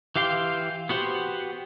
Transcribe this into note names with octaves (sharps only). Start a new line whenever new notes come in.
E3 G4 F5 G5 C6
B3 F#4 G4 C5